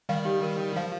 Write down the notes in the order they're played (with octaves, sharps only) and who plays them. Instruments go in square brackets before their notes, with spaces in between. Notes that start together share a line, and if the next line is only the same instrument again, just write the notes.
[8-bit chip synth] D#3 G3 [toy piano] F5
[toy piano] G4
A#4
A#4
[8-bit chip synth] F3 [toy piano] F5